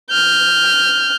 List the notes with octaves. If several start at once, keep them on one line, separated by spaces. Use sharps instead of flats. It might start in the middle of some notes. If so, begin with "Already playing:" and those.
F6 G6